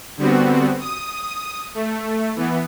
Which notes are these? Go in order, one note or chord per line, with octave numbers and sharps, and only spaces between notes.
D3 G3 B3 C4 F#4
D#6
A3
E3 B3